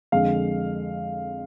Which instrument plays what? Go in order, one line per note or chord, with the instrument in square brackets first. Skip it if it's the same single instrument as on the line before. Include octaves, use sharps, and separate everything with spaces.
[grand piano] F2 D3 G#3 F5